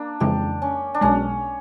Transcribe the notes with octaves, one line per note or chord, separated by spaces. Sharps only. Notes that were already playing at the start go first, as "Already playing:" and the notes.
Already playing: A#3 D4
F2 C#3 E3 G#3 G4
C#4
D4
B1 B2 G#3 C#4